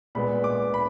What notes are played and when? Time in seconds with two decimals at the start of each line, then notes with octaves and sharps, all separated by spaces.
0.15 A#2 G#3 B3 B5
0.44 D6
0.74 B5